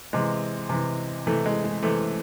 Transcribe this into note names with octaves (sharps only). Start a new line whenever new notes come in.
C3 E3 G#3
C3 E3
C3 E3 A3
G#3
G#3
C3 E3 A3